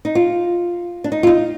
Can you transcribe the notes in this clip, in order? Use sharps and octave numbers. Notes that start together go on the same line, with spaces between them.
D#4
F4
D4
D#4
F4
D#4